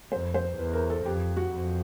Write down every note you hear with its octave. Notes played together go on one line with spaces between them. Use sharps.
F2 C5
C5
E2 B4
A#4
A4
F2 G4
F#4
F2